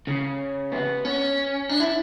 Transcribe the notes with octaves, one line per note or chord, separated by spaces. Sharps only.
C#3
B3
C#4
D4
E4